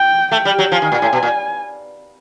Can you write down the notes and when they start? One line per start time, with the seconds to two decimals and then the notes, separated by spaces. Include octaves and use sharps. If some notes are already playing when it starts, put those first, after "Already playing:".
Already playing: G5
0.31 A3 G5
0.45 G3
0.58 F#3
0.72 F3 G#5
0.82 D#3
0.92 A#2
1.02 A2
1.13 B2
1.23 A#2